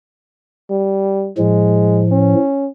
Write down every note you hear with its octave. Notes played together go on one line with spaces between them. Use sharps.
G3
A2 F3 G#3
C#4